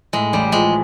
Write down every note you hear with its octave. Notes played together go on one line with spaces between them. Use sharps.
A2 G#3
A1 G3
F3 G#3